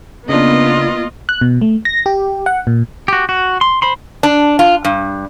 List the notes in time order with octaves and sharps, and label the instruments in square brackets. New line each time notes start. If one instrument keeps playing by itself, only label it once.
[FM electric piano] C#3 D4 [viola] A#3 F4 [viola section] B3 [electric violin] D#5
[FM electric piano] F#6
B2
A3
A#6
G4
F#5
A#2
[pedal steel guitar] F#4 G4
F#4
C6
C5 B5 C6
[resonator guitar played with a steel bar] D4
F4
G2